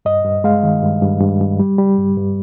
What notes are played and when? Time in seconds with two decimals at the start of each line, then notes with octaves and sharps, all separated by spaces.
0.05 G2 D#5
0.25 G2
0.44 G#3 F5
0.63 D#3
0.83 G2
1.02 G2
1.21 G2
1.40 G2
1.59 G3
1.79 G3
1.98 G2
2.17 G2